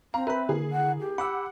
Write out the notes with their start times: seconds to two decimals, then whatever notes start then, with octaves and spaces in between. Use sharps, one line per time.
0.14 C4 F5 A#5
0.27 B4 E5 B5
0.49 D3 A#3 E4 G#4
0.72 F#5
1.00 G4
1.18 F#5 B5 D6 E6